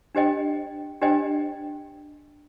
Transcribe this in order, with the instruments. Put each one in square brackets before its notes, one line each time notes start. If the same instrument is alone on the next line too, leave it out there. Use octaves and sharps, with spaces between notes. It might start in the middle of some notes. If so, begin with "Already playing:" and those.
[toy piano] D4 G4 C5 D#5 G5
D4 G4 C5 D#5 G5